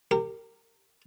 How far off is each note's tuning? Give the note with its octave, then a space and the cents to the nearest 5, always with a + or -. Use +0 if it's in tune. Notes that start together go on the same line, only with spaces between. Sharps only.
G4 +0 A#4 -25